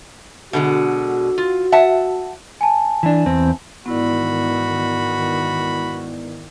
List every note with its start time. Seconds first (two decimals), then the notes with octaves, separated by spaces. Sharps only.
0.53 B2 D3 G#3 F#4
1.38 F4
1.72 E5 F#5 A5
2.61 G#5 A5
3.03 E3 D4
3.26 E2 C4
3.86 G#2 D#3 E3 B3 E4 F#4 D5 B5